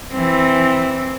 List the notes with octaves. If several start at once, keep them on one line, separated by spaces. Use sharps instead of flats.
E3 C4